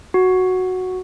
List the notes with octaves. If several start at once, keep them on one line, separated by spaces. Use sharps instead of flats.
F#4